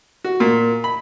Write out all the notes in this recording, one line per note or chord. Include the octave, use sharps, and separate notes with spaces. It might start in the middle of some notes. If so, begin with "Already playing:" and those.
F#4
A#2
B5